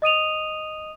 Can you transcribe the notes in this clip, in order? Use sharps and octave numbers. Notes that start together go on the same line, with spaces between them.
D#5 D#6 D#7 F7